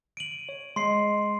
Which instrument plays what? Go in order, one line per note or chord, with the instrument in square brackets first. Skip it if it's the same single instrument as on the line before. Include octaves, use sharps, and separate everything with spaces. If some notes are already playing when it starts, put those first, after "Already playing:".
[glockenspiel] D7 D#7 F#7
[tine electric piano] C#5
[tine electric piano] G#3 D#5 [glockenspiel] C6 C7